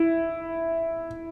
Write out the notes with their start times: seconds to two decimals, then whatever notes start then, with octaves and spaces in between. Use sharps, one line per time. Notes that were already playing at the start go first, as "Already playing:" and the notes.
Already playing: E4